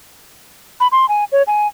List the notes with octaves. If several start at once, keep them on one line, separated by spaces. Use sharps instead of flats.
B5
C6
G#5
C#5
G#5